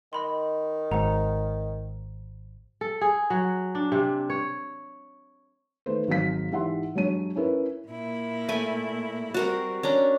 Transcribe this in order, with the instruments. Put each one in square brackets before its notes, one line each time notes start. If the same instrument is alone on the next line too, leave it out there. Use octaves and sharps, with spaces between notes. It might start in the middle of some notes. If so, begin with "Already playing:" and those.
[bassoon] D#3 [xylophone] D#5 B5 C6
[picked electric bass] G#1 [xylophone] C5 F#5 A#5
[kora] A4
G#4
F#3
D4
C3
C#5
[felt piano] D#3 A3 B4 C5
G#1 F#3 F5 B6
G#2 E3 G4 E5 F#5 C6
G2 F#3 G#3 C#5 A5 D#7
C#4 E4 A#4 B4
[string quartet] A#2 E4
[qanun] A3 G#5 B5
[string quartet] G3 C4 [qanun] F#4 A#4 F#5
[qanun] C#4 D4 A#5